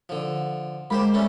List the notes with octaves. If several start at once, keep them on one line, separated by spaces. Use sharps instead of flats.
D3 F3
G#3 A#3 G4 C5 B5
G3 A3 C#4